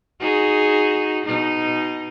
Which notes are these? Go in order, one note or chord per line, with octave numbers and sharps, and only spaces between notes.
D#4 F#4 G#4
B2 D#4